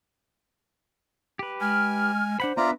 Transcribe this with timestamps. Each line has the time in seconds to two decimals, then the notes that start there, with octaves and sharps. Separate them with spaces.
1.39 G4 B4
1.61 G#3 G#5 F6
2.40 D4 C5 F#5 B5
2.57 B3 D4 F4 B4 D5 E5 A#5